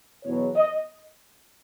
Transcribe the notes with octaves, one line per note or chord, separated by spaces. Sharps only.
E2 B2 F#3 C#5
D#5